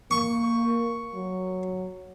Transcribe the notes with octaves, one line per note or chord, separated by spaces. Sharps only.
A#3 C#6
F#3